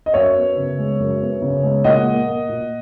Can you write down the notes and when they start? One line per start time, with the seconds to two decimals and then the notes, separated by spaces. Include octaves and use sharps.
0.06 D#5
0.14 F#2 C#5 E5
0.35 B3
0.56 C#3
0.78 G#3
0.99 F#2
1.21 B3
1.42 C#3
1.63 G#3
1.84 A#2 D#5 F#5
2.06 A#3
2.27 A#3
2.49 A#2